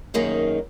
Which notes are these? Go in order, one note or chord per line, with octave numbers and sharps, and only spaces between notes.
F#2 D#3 A#3 D#4 G#4